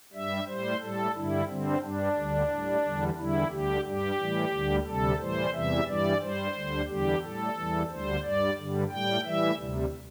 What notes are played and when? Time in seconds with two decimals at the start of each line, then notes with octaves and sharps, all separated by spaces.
0.13 G2 G3 E5
0.46 A2 G3 C5
0.81 A2 G3 A4
1.14 G2 D3 G3 E4
1.48 G2 D3 G3 C4
1.81 G2 G3 D4
2.16 D2 D3 G3
2.49 A2 G3
2.83 E2 D3 G3
3.17 E2 D3 G3 E4
3.50 D2 D3 G3 G4
3.85 G2 G3 G4
4.18 A2 E3 G3
4.52 D2 D3 G3
4.85 D2 C3 G3 A4
5.19 A2 E3 G3 C5
5.53 E2 C3 E3 G3 E5
5.87 G2 E3 G3 D5
6.21 G2 G3 C5
6.54 D2 D3 G3
6.88 E2 D3 G3 G4
7.22 A2 G3 A4
7.56 E2 E3 G3
7.89 D2 D3 G3 C5
8.23 G2 G3 D5
8.57 G2 D3 G3
8.90 A2 G3 G5
9.24 A2 E3 G3 E5
9.58 D2 C3 G3